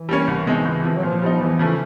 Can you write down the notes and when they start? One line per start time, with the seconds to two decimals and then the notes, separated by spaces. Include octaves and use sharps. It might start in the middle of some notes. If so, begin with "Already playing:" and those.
Already playing: E3
0.09 G3 A#3 C#4
0.27 C2
0.47 B2 G#3 C4 D#4
0.65 C#2
0.85 C3 F3
0.96 F#3
1.03 A#2 F3
1.22 G3 B3 D#4
1.41 E2 E3
1.59 C#3 F3 A3